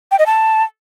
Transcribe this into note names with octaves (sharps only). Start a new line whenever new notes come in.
G5
D#5
A5